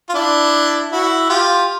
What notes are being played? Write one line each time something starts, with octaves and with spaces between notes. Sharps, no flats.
F4
D4 E4
E4 F#4
F4 G4